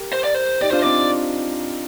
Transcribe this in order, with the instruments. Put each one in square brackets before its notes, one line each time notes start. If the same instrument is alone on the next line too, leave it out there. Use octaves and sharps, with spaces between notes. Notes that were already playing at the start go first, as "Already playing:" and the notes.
Already playing: [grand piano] G4 A#4
[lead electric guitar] C5
D5
C5
[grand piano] D#4 G4 [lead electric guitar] D5
[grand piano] D4 F4 [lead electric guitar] C5
[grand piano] C4 D#4 [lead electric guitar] D5